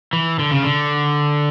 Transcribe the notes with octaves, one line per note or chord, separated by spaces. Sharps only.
E3
D3
C#3
D3